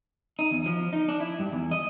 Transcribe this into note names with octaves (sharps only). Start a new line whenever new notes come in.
D#4
E2
F3
D#4
D4
E4
G2
E2
D#5